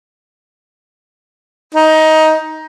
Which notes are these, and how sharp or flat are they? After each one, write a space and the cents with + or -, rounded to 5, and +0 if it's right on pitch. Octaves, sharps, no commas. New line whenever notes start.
D#4 +15